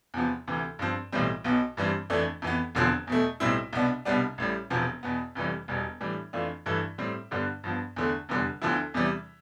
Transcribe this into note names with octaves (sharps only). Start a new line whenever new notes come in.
E2 C3 F3 B3
D2 C3 E3
G2 F3 C4
B1 A2 E3 G3 C4
B1 B2 B3
G2 E3 G3 C4
F2 E3 A3 D4
F2 E3 B3
E1 E2 D3 F3 C4
E2 B2 A3
B1 A2 G3 C4 E4
C2 B2 B3 D4
C2 B2 G3 B3 D4
A1 A2 G3
E1 E2 C3 F3 B3
E2 B2 B3
F1 F2 E3 G3
E1 E2 B2 G3
A2 E3 G3 D4
F2 E3 A3 D4 F4
G2 E3 A3 E4
A2 G3 C4
G2 D3 G3 B3 D4
G2 F3 B3
E2 D3 A3
F1 E2 D3 G3
D2 D3 F3 B3 E4
E2 C3 E3 G3